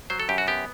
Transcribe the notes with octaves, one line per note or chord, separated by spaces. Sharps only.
F#3 C5
A4
F#2 G4
F#4
B3 G4